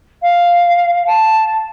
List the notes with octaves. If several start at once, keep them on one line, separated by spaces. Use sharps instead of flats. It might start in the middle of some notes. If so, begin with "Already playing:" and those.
F5
A5